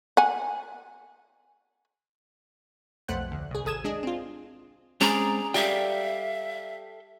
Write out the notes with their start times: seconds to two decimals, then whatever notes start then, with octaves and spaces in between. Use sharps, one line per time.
0.17 F#5 G#5
3.08 B1 F2 A3 C5 F#5 F#6
3.32 D2
3.51 C2 G#4
3.65 G#1 A4 D#6 G#6 E7
3.84 G#3 D4 G#4 D#5
4.03 C4 F4
5.01 G#3 C4 C#4 G#4 D5 A#5
5.54 G3 G4 A4 E5 F5 G5